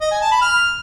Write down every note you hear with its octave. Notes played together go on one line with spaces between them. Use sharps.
D#5
G#5
A5
B5
F6